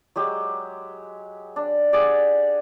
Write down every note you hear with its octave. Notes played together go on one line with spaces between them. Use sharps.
F#3 G#3 G4
D4
G4 G#4 D5 F#5